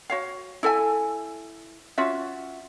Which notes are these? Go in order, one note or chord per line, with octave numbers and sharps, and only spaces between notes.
F#4 C#5 F5
E4 A4 E5 G#5
C#4 F4 F#4 E5